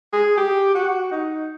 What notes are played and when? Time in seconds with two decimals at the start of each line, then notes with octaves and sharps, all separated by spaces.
0.13 G#4
0.37 G4
0.75 F#4
1.11 D#4